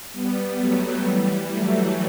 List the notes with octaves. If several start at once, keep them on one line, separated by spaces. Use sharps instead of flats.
G3 B3
F#3 A3
E3 G3
F#3 A3